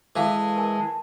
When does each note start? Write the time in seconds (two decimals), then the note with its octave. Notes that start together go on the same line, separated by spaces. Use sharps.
0.16 E3 G#3 A4 F5 A5
0.56 A#4 G#5